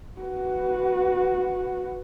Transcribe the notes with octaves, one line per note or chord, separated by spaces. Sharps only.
F#4 B4